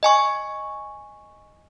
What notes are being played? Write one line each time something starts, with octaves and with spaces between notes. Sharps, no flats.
D#5 G#5 C#6